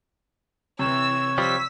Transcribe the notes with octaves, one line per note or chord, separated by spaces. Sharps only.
C3 E3 C#5 E6
F3 G3 E6 B6